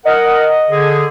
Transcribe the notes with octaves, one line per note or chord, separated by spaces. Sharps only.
A#4 D#5 F#5
D3 G#4